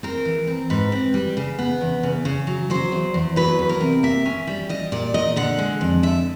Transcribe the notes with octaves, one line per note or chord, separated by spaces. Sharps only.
C4 A#4
E3
C4
G#2 B4
C4
G3
C#3
B3
E2
C#3
C#3
F#3
F#3 C5
E2
E2
F#3 B4
E2
A#4
C3
A#3 E5
C#4
G3
G3 D#5
A#2 D5
A#2 D#5
D3 F#5
G#3
F2
D3 E5